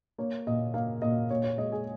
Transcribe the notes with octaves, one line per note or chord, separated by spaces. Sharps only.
A#3 C#5
A#2 D#5
A#3 F5
A#2 D#5
A#2 C#5
C#5
G#3 D#5
G#4